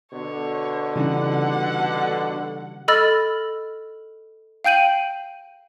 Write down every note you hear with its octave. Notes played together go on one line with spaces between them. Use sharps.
B2 D3 C#5
C#3 E3 G3 D#4 F#5
A4 D#5 B5 E6 F6 A6
F5 G5 G6 D#7 F#7